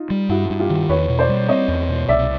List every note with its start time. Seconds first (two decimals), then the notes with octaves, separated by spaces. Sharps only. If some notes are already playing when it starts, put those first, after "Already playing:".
Already playing: D#4 F4
0.10 G3
0.29 G2 E4 F#4
0.50 G2
0.60 F4 G4
0.70 D#3
0.89 E2 B4 C#5
1.09 B2
1.19 C5 D5
1.29 G3
1.48 C4 C#5 D#5
1.68 E2
1.89 B2
2.09 C2 D5 E5